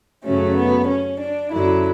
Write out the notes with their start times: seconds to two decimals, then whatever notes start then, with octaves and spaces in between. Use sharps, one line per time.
0.24 F#2 C#3 F#3 A3 C#4
0.57 B3
0.88 C#4
1.20 D4
1.52 F#2 D3 F#3 E4